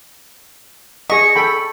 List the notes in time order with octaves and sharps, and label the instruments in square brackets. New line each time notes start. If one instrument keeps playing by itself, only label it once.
[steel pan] G#4 D#5 [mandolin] C#6
[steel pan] A4 G5 B5